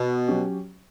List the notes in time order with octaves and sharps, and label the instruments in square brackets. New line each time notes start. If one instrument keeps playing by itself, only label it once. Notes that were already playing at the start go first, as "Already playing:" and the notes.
Already playing: [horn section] B2
[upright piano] F#3 C#4 G4